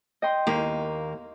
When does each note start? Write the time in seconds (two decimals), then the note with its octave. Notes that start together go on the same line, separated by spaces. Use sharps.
0.22 D#5 G5 C6
0.47 D#2 A#3